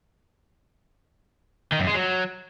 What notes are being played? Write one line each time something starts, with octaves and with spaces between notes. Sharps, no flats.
D#3
F#2
G#3
F#3